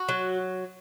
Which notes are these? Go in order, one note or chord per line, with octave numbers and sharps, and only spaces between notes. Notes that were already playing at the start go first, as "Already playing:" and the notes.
Already playing: F#4
F#3